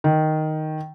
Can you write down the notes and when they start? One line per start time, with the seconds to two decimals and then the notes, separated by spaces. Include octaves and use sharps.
0.04 D#3